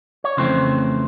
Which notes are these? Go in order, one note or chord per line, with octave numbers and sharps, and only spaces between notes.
C#5
F2 C#3 E3 A3 C4 C5